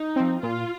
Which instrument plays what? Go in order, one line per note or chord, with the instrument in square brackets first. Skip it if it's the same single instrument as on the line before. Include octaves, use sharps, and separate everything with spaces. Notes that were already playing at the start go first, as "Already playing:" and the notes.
Already playing: [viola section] D#4
[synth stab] F3 C4
[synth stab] A#2 [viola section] F4